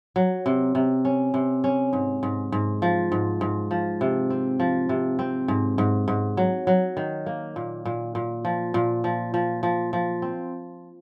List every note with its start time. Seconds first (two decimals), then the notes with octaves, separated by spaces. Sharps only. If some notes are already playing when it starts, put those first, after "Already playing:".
0.16 F#3
0.46 C3
0.75 C3
1.05 C#4
1.34 C3
1.64 C#4
1.93 G#2
2.23 G#2
2.52 G#2
2.82 F3
3.12 G#2
3.41 G#2
3.71 F3
4.01 C3
4.30 C4
4.60 F3
4.89 C3
5.19 C4
5.48 G#2
5.78 G#2
6.08 G#2
6.37 F#3
6.67 F#3
6.97 D#3
7.26 A#3
7.56 A#2
7.85 A#2
8.15 A#2
8.45 F3
8.74 A#2
9.04 F3
9.34 F3
9.63 F3
9.93 F3
10.22 C4